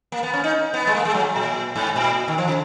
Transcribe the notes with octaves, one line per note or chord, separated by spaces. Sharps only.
A#3
B3
C#4
D#4
B3
G#3
A#3
G#3
F#3
A#2
G#2
A#2
D#3
F3
C#3